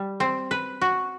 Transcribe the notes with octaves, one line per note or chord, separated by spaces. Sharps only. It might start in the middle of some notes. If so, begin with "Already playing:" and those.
Already playing: G3
C4
B4
F#4